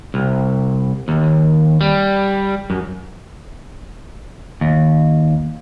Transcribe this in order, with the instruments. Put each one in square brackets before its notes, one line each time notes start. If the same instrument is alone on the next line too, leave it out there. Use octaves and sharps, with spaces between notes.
[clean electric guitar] C2
D#2
G3
F#2
D#2